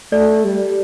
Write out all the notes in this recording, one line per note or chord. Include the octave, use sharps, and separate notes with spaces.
A3 D5
G3